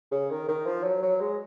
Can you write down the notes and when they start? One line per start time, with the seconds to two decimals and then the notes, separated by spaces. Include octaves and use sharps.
0.11 C#3
0.30 D#3
0.48 D#3
0.66 F3
0.84 F#3
1.02 F#3
1.21 G#3